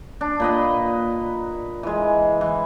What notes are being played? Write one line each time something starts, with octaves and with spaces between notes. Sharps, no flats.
D4
A#2 B4 D#5
E3 G#3
E3